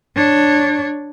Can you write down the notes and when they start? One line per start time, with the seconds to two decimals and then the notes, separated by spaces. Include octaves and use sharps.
0.16 D4 C#5